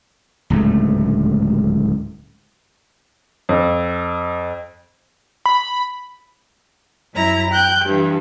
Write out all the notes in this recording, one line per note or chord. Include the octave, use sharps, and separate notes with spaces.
D1 C#2 G#2 A3
F2
B5
F#2 E4 A#5
G5 F#6 G6
G2 E3